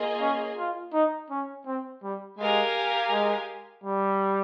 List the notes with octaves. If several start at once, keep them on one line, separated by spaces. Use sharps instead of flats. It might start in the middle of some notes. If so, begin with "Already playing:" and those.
Already playing: A#3 F4 G#4 D#5 G#5
C#4
F4
D#4
C#4
C4
G3
G#3 G4 A#4 F5 G#5
G#3
G3